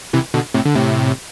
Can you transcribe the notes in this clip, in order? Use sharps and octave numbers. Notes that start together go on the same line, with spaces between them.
C3 E3
B2 D3
A2 C3
D3
A2 C3